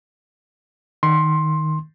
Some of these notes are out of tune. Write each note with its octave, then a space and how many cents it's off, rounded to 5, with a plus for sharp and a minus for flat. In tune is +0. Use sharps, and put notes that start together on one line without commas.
D#3 +0 C6 +15